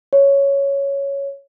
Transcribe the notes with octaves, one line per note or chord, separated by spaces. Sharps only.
C#5